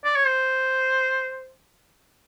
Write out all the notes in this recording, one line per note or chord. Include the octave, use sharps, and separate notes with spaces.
D5
C#5
C5